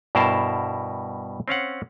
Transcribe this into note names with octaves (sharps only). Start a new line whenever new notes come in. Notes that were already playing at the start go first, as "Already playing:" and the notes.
G2 B2 E4 A#4 C5 A5
C4 C#4 F5 F#5